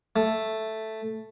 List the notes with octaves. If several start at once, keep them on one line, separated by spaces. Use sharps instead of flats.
A3